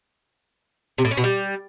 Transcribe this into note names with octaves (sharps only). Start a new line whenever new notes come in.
C3
A2
C#4
B2
G3